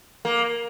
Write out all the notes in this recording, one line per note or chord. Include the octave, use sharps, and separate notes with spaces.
A#3